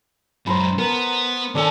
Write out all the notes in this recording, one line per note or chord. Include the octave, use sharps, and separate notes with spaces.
C#2 F#2 C5 A#5 B5
B3 A#4
D#3 D4 A4 G#5 C6